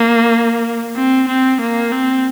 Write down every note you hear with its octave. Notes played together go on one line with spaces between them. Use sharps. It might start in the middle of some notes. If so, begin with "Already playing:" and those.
Already playing: A#3
C4
C4
A#3
C4